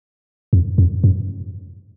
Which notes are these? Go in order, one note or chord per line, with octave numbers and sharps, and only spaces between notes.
F2
F2
F#2